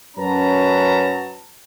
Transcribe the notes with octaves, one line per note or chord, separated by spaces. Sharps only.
F#2 F#3 C#4 B4 A5 A#5